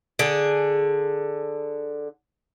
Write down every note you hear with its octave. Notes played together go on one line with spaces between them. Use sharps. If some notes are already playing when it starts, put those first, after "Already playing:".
D3 G#4